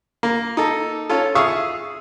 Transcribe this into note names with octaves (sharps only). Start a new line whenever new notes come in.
A#3
D#4 A4
C#4 F4 A4
G#4 E5 F5 C#6 D#6 E6